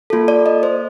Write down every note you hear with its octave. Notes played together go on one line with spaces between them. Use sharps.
A#3 F4 A4
D5
D#5
C5